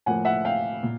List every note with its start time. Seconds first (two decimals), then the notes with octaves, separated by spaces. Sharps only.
0.06 A2 F3 A#3 F#5 G#5
0.25 E5 F#5
0.45 F5 G5
0.83 A#2